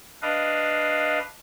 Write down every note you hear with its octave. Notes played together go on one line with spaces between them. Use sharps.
D4 B4 D#5 F5